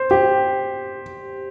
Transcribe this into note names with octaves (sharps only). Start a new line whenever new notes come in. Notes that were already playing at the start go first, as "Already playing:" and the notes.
Already playing: C5
G4